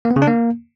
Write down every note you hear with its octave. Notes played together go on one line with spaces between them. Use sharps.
A#3
B3
C#3
D4
A#3